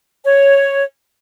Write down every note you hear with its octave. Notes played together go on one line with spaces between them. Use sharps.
C#5